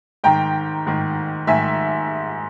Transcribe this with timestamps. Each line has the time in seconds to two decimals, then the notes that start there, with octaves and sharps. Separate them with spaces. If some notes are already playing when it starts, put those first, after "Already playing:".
0.24 G#2 D#3 G5 A#5
0.86 G#2 D#3
1.47 G#2 D#3 E5 G#5